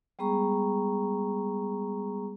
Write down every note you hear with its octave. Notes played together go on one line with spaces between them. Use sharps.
G3 G#3 B3 G#4 A#5 C#6